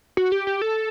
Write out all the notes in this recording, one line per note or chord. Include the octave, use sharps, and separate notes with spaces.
F#4
G4
G4
A4